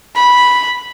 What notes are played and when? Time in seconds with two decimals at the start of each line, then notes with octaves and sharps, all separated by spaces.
0.16 B5